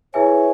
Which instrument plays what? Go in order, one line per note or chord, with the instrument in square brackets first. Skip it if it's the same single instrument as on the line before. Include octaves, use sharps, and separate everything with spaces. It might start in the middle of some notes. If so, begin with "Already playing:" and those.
[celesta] E4 G#4 B4 E5 G#5 [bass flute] C#5